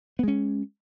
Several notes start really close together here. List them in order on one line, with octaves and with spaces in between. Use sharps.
B3 G#3 C#4